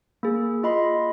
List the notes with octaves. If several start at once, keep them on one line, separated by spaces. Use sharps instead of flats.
A#3 G#4
F4 D#5 B5 C6